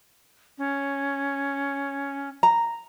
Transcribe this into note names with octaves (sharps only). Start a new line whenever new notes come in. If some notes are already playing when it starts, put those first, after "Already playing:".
C#4
A#5